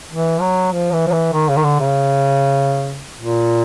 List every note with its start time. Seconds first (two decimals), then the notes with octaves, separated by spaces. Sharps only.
0.10 E3
0.40 F#3
0.72 F3
0.92 E3
1.07 F3
1.12 E3
1.33 D#3
1.48 C#3
1.57 D#3
1.64 D3
1.80 C#3
3.18 A#2